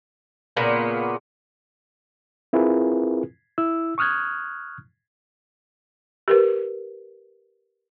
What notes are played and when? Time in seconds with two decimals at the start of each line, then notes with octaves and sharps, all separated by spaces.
0.57 A#2 C#3 A#3 B3
2.53 C4 E4 F4 G#4 A#4 B4
3.58 E4 E6
3.98 C#6 D#6 F6 F#6 G#6
6.28 G4 A#4 B4